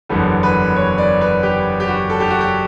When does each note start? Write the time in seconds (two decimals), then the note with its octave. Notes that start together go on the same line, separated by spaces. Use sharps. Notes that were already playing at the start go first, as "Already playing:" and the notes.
0.09 F#1 E2 D3 G3 B3 A4
0.43 B4
0.76 C#5
0.98 D5
1.21 B4
1.43 G4
1.80 G4
1.88 F#4
2.10 A4
2.20 G4
2.30 F#4
2.41 G4